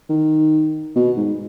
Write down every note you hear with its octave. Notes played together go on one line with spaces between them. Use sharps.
D#3
B2
G#2